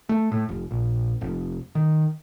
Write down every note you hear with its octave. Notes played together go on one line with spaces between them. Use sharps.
A3
A2
F1
A#1
F1
D#3